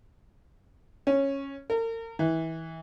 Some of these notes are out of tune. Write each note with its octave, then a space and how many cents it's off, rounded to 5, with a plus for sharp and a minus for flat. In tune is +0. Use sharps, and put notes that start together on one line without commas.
C#4 -10
A#4 -40
E3 -25